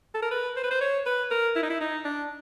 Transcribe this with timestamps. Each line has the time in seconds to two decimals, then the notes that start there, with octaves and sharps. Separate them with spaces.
0.14 A4
0.22 A#4
0.31 B4
0.56 C5
0.63 B4
0.71 C5
0.81 C#5
1.06 B4
1.31 A#4
1.55 E4
1.63 D#4
1.70 E4
1.80 D#4
2.05 D4